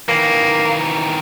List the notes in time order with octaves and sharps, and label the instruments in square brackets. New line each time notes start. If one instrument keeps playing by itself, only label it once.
[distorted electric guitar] D#3 E3 [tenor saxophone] A#3